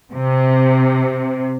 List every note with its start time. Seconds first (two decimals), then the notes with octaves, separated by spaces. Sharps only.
0.14 C3